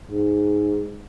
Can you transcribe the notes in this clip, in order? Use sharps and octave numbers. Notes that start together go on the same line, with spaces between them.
G#2